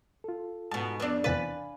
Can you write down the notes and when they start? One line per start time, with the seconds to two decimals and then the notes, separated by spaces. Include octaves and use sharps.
0.24 F4 A4
0.71 G#2 B2 A5
1.00 F2 B3 D4 B4
1.24 E2 C3 B4 F5 G#5 A6